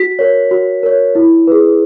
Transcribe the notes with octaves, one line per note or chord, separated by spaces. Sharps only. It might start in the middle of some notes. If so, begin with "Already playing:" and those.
Already playing: F#4 B6
A#4 C#5
F#4
A#4 C#5
E4
G#4 B4